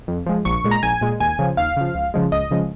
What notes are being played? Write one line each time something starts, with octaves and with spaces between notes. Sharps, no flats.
F2
F3 G#3
A#1 C#6
A#2 G#3
A#5
A#1 G#5
A#2 G#3
D#2 G#5
C#3 F3
D#2 F5
C#3 F3
C#2
C#3 F3 G#3
C#2 D#5
C#3 F3 G#3